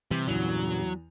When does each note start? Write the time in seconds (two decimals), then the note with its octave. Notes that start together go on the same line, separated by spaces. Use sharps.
0.11 C3 E3 G3
0.27 E2 G2 A#2 C#3 F#3 F7